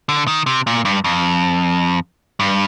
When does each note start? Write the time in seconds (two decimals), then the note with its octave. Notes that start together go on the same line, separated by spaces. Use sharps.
0.09 D3
0.27 D#3
0.46 C3
0.67 A#2
0.85 G2
1.04 F2
2.40 G2